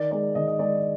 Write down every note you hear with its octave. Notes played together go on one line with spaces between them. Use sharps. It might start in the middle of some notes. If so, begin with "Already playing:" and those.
Already playing: D#3 D5
G#3 D5
D#3 D#5
D#5
G#3 D5